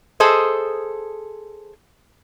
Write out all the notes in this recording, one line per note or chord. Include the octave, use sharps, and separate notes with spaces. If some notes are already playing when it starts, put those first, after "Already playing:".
G#4 A4 C5 D#5